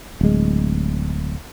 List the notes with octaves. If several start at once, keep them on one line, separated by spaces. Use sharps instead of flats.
D1 G#3